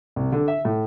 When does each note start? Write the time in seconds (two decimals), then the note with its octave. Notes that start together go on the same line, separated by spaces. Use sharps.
0.16 C2
0.32 D3
0.48 E5
0.65 A2